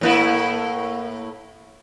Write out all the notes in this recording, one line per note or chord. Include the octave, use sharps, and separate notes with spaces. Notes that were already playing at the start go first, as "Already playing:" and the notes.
A2 A#3 E4